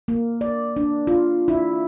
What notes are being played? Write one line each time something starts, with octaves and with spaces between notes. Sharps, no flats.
A#3
D5
D4
F4
E4